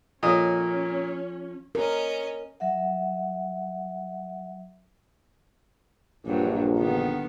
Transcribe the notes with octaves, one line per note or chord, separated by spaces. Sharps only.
A#2 F3 C#4 A4 C#5 D#5 D#6
C#4 A#4 D#5
F#3 E5 F#5
A#1 G2 F#3
D3 D#3 B3